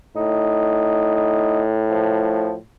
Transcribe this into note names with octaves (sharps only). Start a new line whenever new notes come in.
A2 D#4
D#4
F3